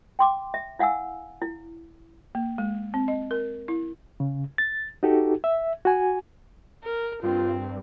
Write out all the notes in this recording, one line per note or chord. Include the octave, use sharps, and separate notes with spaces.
G5 C6 D6
E5
E4 F5 F#5 G#5 E6
E4
A#3
G#3
C4
D#5
A#4
E4
C#3
A6
D#4 F#4 G4 A4
E5
F#4 G#5
A#4
G2 C4 F4